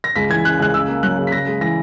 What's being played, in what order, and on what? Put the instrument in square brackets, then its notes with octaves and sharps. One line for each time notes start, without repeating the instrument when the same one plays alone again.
[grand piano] A#6
[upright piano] C#2 [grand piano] B6
[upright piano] E3 [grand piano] G#6
[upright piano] C#3 [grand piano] F#6
[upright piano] C#2 [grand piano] F#6
[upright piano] C#3 [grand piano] E6
[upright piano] A#3
[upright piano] F#3 [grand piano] F#6
[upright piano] C#3
[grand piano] B6
[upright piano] C#3 [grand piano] A#6
[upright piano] G#3
[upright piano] E3 [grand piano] A#6